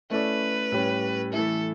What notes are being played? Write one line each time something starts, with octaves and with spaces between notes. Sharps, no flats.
A3 C#4 E4 A4 B4 D5
A2 G3 C#4 G4 C#5
E3 A3 E4 A4